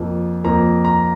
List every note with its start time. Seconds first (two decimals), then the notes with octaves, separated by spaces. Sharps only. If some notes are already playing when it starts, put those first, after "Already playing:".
Already playing: F2 F3 A#3
0.44 F2 F3 A#3 A#5
0.85 A#5